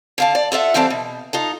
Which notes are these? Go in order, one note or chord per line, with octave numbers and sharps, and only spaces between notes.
D3 F5 A5
D5
F4 A4 E5 F#5
G2 E3 C4 A4 F5 A5
B2
D#4 F4 A4